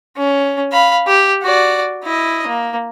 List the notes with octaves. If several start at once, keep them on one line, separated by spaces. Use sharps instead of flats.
C#4
F5 B5
G4
F#4 D5
E4 D#5
A#3